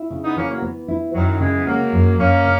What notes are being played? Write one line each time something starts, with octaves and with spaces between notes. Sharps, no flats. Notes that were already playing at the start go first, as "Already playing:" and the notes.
Already playing: E4
C#3
B3 D#4
E3 A#3 C#4
F#3 A#3
B3
E4
F#2 D#3 F#3
C#3 E3 G#3
B3
F#3 G#3 A#3
F#2
F#2 A#3 C#4
C#3